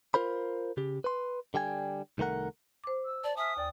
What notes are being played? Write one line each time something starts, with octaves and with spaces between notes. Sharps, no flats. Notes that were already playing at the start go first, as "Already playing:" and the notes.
F4 A#4 C5 B5
C#3 G4
B4 C6
D3 G3 G5 G#5
C2 D#3 A3 A#4 F#5
C5 D6
E6
D5 A5
E5 G#5 D#6 F6
D#2 D5 G5